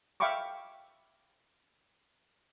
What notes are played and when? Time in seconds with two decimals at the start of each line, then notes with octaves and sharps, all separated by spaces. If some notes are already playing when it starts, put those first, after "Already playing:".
0.20 E5 F5 G5 B5 C#6 D6